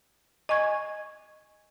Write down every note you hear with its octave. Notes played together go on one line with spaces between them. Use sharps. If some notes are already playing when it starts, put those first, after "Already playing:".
D#5 G#5 C#6 G#6